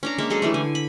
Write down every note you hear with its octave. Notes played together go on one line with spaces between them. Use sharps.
C#4 D4 A#5
G#3 A#3 E5
F#3 G#3 G#4 A4
E3 G3 A3
D3 G#5
B5